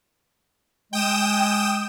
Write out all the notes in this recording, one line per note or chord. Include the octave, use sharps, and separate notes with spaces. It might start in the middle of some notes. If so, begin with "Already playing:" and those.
G#3 G5 D#6 E7